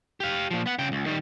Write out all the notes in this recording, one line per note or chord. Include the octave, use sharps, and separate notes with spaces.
G4 F5
A#2 F3
B3 F#5
C#3 G5
C#2
D#3 G3